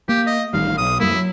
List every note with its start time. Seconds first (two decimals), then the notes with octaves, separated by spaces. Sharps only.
0.09 A#3 G4
0.27 D#5
0.53 A1 D#3 G3 F5
0.78 B1 D#6
1.00 F#2 G3 A#3 E4
1.14 F#3